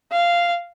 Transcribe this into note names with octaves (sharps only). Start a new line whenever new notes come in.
F5